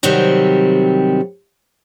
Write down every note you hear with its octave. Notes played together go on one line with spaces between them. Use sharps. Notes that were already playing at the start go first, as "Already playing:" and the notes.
C3 D#3 F#3 G3 C4